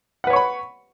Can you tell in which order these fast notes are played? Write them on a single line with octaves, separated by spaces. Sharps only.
F#5 B4 C#5 C#6 B5